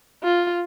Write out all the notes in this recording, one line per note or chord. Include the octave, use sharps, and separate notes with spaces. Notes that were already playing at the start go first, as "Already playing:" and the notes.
F4